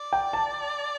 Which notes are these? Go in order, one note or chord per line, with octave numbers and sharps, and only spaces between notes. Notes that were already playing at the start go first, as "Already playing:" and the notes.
Already playing: D5
G5
A5